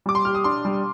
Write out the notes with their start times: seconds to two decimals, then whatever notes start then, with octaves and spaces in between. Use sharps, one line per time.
0.06 G3 D6
0.15 C6
0.25 G4 F6
0.35 D#6
0.44 D4 C6
0.65 G3